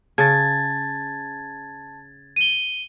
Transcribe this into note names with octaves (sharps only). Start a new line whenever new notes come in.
C#3 A5 G#6 A6
D#7 G7